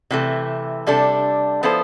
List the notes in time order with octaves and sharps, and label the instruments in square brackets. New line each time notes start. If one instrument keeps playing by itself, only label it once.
[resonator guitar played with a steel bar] C3 E3 A3
C3 G3 D4 A4
F3 B3 E4 A4 C5